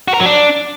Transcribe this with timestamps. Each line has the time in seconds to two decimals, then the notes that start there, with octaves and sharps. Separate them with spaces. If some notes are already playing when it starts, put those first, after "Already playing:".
0.08 F#4
0.14 A#4
0.20 F#3
0.26 D4